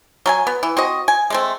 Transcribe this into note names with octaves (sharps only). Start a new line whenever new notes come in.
F#3 A4 G#5
B3
E3
C4 F#4 D#5
G#5
G#3 A3 C4